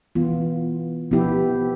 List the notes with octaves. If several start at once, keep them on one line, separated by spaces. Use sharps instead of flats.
E3 B3 F4
F3 B3 E4 G4